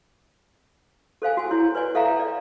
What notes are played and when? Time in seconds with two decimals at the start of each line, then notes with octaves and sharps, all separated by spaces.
1.22 A4 C5 F5 G#5
1.37 F#4 G#5
1.51 E4 C#5
1.75 B4 C#5 D5 G#5
1.95 A4 E5 F5 G5 A#5
2.20 D5